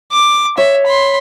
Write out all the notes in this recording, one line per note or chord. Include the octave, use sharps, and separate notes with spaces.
D6
C#5 E5
B5 C6